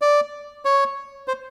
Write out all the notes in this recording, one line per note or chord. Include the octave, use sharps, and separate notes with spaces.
D5
C#5
C5